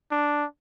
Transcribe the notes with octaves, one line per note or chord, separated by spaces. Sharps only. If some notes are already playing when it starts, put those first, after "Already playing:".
D4